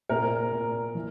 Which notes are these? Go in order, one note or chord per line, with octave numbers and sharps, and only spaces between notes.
A#2 A#4
A#2
E3